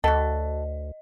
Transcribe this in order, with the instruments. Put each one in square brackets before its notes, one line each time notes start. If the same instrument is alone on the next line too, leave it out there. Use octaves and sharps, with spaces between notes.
[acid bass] D2 [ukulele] F#4 A4 [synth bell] D#5